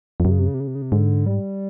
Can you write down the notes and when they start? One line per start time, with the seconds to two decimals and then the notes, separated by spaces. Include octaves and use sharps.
0.20 F2
0.25 F#2 C3
0.31 C#3
0.39 C3
0.47 C#3
0.54 C3
0.60 C#3
0.67 C3
0.75 C#3
0.82 C3
0.92 G#2 D3
1.26 G3